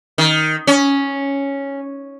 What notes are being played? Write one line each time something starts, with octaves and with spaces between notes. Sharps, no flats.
D#3
C#4